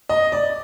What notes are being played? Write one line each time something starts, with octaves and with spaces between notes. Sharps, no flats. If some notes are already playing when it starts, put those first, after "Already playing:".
D#5
D5